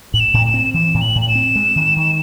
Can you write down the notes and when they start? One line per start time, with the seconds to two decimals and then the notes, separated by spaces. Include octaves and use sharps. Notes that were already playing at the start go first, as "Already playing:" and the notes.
0.14 A2 F#7
0.20 E7
0.34 A2
0.47 E7
0.54 C4
0.74 E3 E7
0.94 A2
1.01 F#7
1.15 A2
1.22 F#7
1.29 E7
1.35 C4
1.56 G#3
1.76 D#3
1.96 D#3